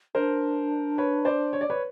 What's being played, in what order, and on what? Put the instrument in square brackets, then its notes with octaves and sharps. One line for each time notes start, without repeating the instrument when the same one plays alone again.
[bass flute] D4 [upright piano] A#4 C5
[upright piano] B4 C#5
C5 D5
C#5
D5
B4 C#5